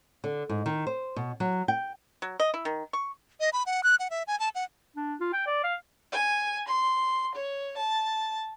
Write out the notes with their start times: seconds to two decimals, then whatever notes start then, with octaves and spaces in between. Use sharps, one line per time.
0.24 D3
0.49 G#2
0.66 D#3
0.87 C5
1.16 B2
1.40 F#3
1.68 G5
2.22 F#3
2.40 D#5
2.54 E4
2.65 D#3
2.93 C#6
3.40 D#5
3.53 B5
3.66 F#5
3.84 F#6
3.99 F#5
4.11 E5
4.27 G#5
4.40 A5
4.55 F#5
4.96 D4
5.20 F4
5.33 G5
5.47 D5
5.64 F5
6.12 G#5
6.68 C6
7.34 C#5
7.77 A5